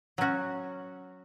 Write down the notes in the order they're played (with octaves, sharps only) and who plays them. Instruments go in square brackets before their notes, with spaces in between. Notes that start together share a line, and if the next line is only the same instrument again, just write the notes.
[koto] F#3 C#4 F#4